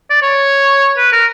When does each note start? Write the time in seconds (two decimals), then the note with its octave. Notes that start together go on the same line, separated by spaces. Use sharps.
0.10 D5
0.22 C#5
0.97 B4
1.12 A#4